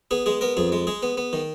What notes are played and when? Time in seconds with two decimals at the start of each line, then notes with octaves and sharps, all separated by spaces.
0.11 B3 G#4
0.26 G#3 G#4
0.41 B3 A#4
0.57 F2 G#4
0.72 G#3
0.87 G#3 G#4
1.03 B3
1.17 B3
1.33 D#3